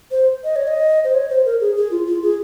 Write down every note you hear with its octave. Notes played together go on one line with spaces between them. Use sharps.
C5
D#5
C#5
D#5
C5
C#5
C5
A#4
G#4
G#4
F4
F4
G#4